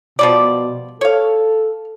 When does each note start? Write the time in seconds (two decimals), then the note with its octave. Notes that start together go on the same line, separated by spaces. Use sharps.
0.19 B2 F3 G3 D5
1.01 A4 C#5 F5